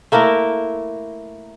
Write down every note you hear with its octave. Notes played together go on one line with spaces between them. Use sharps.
A3 A#3 E4 A#4